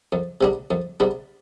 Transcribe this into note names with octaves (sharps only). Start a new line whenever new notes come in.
F2
C3 G3 B3 D4
F2
C3 G3 B3 D4